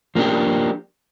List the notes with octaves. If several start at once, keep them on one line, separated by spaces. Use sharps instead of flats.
F3 A#3 D4 G4